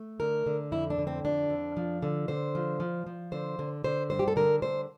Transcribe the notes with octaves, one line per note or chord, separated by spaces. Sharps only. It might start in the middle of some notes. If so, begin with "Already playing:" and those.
Already playing: A3
D3 A#4
D3
F2 E4
D4
D3
C4
F2 D4
F2
F3
D3
D3 C5
F3
F3
F3
D3 C5
D3
D3 C5
G2 C5
G4
A4
D3 A#4
D3 C5